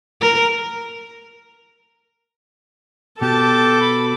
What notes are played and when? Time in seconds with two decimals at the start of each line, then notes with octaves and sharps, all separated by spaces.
0.21 A#4
3.21 B2 B3 F#4 G4 A4 A5 D6
3.81 B5